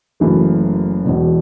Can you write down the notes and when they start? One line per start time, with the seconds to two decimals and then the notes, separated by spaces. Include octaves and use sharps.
0.20 F#1 F#2 C#3 E3 A3
1.04 E1 E2 B2